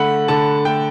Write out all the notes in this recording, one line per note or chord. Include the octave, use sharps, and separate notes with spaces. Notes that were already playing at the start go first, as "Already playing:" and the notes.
Already playing: D3 A3 F#5 B5
D3 A5
A3 G5